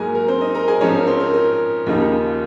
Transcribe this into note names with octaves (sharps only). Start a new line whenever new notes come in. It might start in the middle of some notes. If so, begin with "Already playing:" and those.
Already playing: G#2 F#3 A#3 G#4 A#4 G#5 A#5
A#4
C4 C5
D#4 D#5
A#4 A#5
G#4 G#5
G#2 F3 C4 C#4 D#4 C#5
A#4
C4 C5
A#4
A#4
D#2 C#3 F3 A#3 D#4